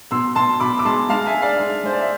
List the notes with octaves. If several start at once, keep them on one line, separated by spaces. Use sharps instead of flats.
B2 C6 E6
B2 A5 C6
B2 B5 D6
D6
G#3 A5 C6
G#3 F5 A5
E5 G#5
G#3
D5 F5
G#3
G#3 C5
D5
E5